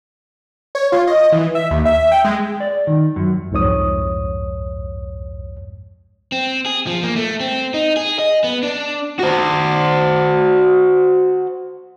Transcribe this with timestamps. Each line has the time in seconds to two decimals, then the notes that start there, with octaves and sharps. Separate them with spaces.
0.75 C#5
0.92 F4
1.07 D#5
1.32 E3
1.55 E5
1.71 D#2
1.85 E5
2.12 G5
2.24 G#3
2.60 D5
2.87 D#3
3.16 F#2
3.52 C2 F2 G#2 C#5 D#6
6.32 C4
6.66 G#4
6.87 F3
7.03 A#3
7.16 A3
7.40 C4
7.74 D#4
7.97 G#4
8.19 D#5
8.44 B3
8.63 D4
9.19 F#4 C5